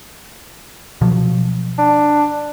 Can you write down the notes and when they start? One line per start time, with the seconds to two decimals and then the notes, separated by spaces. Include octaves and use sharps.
1.01 B2 F3 F#3
1.78 D4